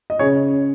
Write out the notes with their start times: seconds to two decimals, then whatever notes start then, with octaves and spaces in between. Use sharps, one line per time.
0.10 D#5
0.19 C#3 G#4 C#5